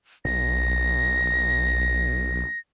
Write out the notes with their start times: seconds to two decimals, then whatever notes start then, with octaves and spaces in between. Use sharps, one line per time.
0.25 B1 A#6